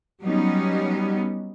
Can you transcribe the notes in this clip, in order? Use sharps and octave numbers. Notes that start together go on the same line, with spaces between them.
F#3 G3 B3 C#4 D#4